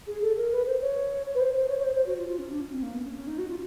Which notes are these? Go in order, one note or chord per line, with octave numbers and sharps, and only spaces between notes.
G#4
A4
A#4
B4
C5
C#5
B4
C5
C5
C#5
C#5
C5
C5
F#4
F4
F4
C#4
D4
C#4
C4
A#3
B3
C#4
C#4
D#4
F#4
F4